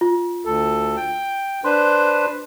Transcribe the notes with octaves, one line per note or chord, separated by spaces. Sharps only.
F4
D2 A4
G5
D4 B4 C5 C6